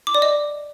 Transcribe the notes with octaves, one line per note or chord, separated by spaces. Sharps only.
D6
D5
D#5